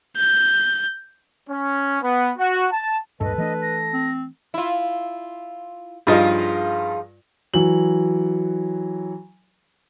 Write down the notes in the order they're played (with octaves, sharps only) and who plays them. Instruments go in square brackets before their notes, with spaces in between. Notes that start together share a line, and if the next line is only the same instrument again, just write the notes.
[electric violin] G6
[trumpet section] C#4
B3
F#4
A5
[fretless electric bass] D1 G2 [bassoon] A4 [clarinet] B4 [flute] D#5
[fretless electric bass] E3 A3 D4 [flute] D#5
[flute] A#6
[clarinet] C4
[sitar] E4 F4
[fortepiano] G2 F4 D#5 [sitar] F3 D#4 G#4
[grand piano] E3 F#3 F#7